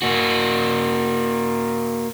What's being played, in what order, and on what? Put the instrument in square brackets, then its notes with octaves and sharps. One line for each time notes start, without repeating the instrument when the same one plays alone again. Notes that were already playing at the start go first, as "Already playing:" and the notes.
[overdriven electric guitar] A#3 F#4